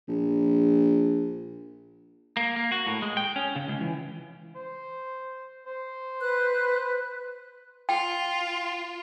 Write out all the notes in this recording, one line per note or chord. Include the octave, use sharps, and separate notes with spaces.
A#1
A#3
A#3
F#4
A2
G#3
G5
C#4
C#3
C#2
E3
C5
C5
B4 F#6
F4 G5